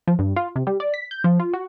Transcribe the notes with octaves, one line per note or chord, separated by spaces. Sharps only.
F3
G2
F4
C3
G3
D5
B6
G6
F3
F4
F#4